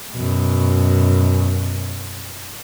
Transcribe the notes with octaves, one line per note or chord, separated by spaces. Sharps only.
F#2 B2